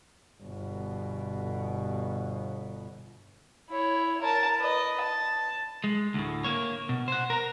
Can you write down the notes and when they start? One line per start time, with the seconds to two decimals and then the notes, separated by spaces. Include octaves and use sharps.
0.41 G1 B2
3.70 E4 C#5
4.21 A#4 A5
4.58 B4 D#5
5.02 A5
5.84 G#3
6.14 D2 A2
6.44 A#3 C#5
6.89 B2
7.08 C5 F#5
7.30 A#4 A#5